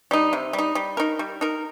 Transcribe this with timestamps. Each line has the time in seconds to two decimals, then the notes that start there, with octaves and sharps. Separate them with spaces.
0.11 G3 D#4
0.33 C3
0.53 G3
0.58 D#4
0.75 G3
0.97 D#4 A#4
1.19 G3
1.41 D#4 A#4